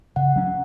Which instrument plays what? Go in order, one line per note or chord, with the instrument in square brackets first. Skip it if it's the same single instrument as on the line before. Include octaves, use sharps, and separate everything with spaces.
[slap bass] C#3 [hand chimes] F#5
[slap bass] F#3 C#4